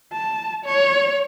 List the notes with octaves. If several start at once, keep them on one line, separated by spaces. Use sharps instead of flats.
A5
C#5